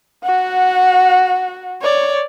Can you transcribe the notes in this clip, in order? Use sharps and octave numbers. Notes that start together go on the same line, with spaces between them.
F#4 F#5
C#5 D5